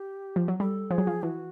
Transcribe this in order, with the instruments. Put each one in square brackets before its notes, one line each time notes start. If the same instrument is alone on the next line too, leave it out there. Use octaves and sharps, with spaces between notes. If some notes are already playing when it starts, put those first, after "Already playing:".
Already playing: [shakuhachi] G4
[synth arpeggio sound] F3
F#3
[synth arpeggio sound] G3 [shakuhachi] A4
[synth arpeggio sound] F3 [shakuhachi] G#4
[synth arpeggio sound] F#3
F3
[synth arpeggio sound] E3 [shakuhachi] F#4